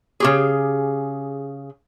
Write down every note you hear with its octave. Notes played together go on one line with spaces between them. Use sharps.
C#3 G4 G#4